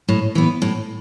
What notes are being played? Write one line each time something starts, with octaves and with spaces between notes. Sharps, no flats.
A2
E3 B3
A2